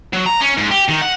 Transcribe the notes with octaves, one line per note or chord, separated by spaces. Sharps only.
F#3
A#5
C#4
G#2
G4
D#3
F#5